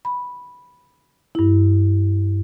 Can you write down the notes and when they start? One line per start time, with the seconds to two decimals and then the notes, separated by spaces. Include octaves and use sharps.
0.05 B5
1.35 G2 E4